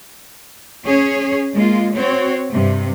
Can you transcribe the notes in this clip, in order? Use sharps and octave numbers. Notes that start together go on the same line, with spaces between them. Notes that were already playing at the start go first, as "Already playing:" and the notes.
C#4 G#4 C#5
G#3 A#3 F4
C4 F#4 C#5
G2 C3